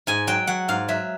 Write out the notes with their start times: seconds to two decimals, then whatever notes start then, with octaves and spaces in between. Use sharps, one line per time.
0.07 G#2 G#5
0.27 F#3 G5
0.47 F#3 F#5
0.68 G#2 F5
0.88 F#3 E5